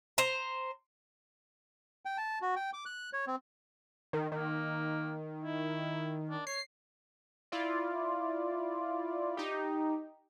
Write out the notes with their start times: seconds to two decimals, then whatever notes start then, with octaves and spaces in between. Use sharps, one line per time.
0.18 C5 A#5
2.05 G5
2.18 A5
2.42 F#4
2.56 G5
2.73 D6
2.86 F#6
3.13 C#5
3.27 C4
4.13 D#3
4.32 D#3 A#3
5.44 E4
6.30 D4
6.47 C#5 C7
7.52 E4 F4 D5
9.37 D#4 G4